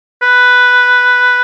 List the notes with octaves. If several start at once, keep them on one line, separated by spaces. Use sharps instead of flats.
B4